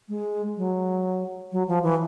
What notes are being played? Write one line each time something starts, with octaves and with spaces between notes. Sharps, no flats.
G#3
F#3
F#3
F3
E3